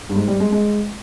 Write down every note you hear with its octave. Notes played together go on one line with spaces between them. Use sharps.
G2
G#2
G3
G#3
G#3